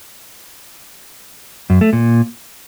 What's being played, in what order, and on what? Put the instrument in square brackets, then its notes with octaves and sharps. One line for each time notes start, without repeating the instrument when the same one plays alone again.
[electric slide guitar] F#2
A3
A#2